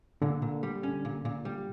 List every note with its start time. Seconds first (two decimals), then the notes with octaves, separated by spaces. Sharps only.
0.22 A#2 D3
0.42 A#2
0.63 G3
0.83 C#4
1.05 A#2
1.25 A#2
1.45 G3